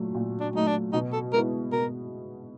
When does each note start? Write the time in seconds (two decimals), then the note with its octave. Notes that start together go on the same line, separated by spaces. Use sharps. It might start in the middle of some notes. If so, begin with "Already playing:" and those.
Already playing: A#2 F#3 A3
0.14 A#2
0.40 D4
0.54 F#3 A3 D#4
0.67 D4
0.93 B2 D#4
1.13 A4
1.33 G#3 B3 E4 A#4
1.72 B2 A#4